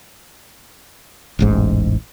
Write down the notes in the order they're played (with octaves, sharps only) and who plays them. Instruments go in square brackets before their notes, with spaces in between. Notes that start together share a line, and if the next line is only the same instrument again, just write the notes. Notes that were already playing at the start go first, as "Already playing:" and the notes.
[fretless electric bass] E1 A1 G#2